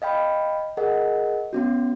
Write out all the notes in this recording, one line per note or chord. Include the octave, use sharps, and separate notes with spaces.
D#5 F5 G5 B5
G#4 A#4 D#5 F#5
B3 C#4 F#4